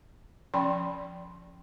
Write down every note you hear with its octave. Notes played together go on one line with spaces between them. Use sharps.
F3 C#4 D5 G5 B5 C6